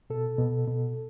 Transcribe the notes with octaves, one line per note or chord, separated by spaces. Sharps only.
B2 A4
B2
B2